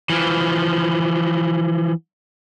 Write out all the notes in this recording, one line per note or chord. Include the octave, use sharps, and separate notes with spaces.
E3 F3